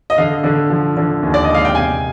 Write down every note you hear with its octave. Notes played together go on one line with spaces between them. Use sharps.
D#5
D3 F5
D3
F3
D3
D#2
D5
D#5
G#3
F5
G5
C3 G#5